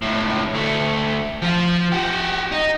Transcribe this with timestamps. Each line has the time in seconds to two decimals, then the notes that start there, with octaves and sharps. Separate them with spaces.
0.02 C#2 A2
0.54 D2 A3
1.42 F3 F4
1.92 F#4 G4
2.52 D#4